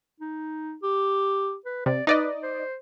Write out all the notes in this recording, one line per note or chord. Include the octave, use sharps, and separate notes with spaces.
D#4
G4
B4
C3 D5
D#4 B4 D5 D#5
C5